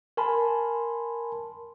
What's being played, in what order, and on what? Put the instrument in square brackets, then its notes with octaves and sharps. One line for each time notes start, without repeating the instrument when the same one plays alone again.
[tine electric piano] A#4 G#5 A5 B5 C6